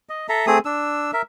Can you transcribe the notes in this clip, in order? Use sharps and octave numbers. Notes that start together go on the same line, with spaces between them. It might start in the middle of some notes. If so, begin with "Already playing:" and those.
D#5
A4 E5 A#5
A3 C4 G#4 D#6
D4 E6
A#4 E5